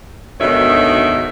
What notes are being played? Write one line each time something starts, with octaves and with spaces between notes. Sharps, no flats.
D2 G#2 B2 D#3 C#5 E5